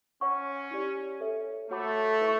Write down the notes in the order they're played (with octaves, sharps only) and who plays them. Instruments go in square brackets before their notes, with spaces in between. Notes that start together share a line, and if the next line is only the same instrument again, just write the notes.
[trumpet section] C#4 [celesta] C#5 F#5 C#6
[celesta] E4 G4 D5
A4 C#5 E5
[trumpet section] A3 [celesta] F#4 C#5 F#5 B5 D6
[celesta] E4 B4 E5 A5 C#6